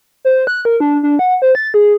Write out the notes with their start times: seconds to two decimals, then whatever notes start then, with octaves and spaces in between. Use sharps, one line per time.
0.25 C5
0.47 F#6
0.65 A#4
0.80 D4
1.03 D4
1.19 F#5
1.42 C5
1.55 A6
1.74 G#4